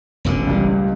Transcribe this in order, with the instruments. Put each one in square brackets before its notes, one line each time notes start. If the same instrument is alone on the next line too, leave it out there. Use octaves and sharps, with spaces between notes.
[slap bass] E1 A1 D3
[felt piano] C#2 G3